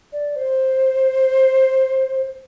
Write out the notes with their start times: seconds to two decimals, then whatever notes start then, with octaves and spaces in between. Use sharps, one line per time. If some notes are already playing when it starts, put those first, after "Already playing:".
0.13 D5
0.36 C5